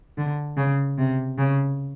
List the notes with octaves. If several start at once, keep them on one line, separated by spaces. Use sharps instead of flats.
D3
C#3
C3
C#3